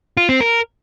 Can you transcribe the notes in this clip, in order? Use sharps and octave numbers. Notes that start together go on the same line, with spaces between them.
F4
C4
A#4